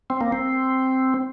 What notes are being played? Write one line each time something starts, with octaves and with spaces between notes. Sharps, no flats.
C4
A#3
C4